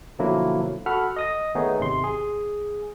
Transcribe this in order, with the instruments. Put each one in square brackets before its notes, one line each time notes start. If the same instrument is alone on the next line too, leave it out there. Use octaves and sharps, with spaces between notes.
[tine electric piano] B2 D3 F3 F#3 A#3 E4
F#4 A4 F#5 B5 F6
D#5 D#6 A#6
D#3 A3 B3 D#4 G#4 C#5
G#1 C3 C6
G#4